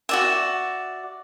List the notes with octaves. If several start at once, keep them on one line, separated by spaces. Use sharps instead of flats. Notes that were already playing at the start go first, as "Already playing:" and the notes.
F#4 D5 E5